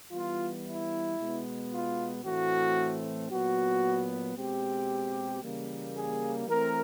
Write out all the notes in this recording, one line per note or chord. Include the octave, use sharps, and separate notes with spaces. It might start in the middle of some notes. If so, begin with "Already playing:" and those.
E3 G3 B3 F4
E4
B2 G#3 B3
F4
A2 E3 A3 C4 F#4
A#2 F#3 B3 F#4
B2 G#3 C4 G4
C#3 E3 G3 A#3
G#4
E3 A3 C4 A#4